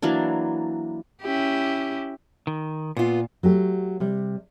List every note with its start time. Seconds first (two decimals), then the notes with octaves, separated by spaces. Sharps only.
0.02 E3 F#3 A#3 D4
1.22 C#4 E4 G4
2.47 D#3
2.97 A#2 B3 F4
3.43 F#3 A3 G4
4.00 C3 G3